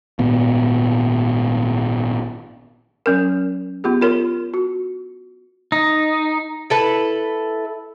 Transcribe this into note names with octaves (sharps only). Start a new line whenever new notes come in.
G#1 A#2 B3
F#3 C#4 A#4
B3 F4 G4 G#4
F4 A#4 C#5 C6
F#4
D#4
E4 A4 B4